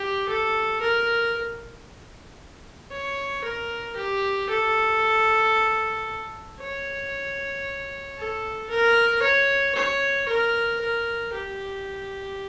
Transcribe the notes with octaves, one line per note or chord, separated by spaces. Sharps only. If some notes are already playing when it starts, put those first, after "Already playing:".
Already playing: G4
A4
A#4
C#5
A#4
G4
A4
C#5
A4
A#4
C#5
C#5
A#4
A#4
G4